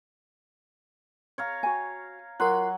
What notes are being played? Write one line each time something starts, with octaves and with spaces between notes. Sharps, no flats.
C#5 F5 A#5
F#4 G#5
F#3 F4 A#4 C6 F#6